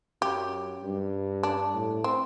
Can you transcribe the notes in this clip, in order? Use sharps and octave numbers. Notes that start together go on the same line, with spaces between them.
F#2 G4
G2
D4
A2
C4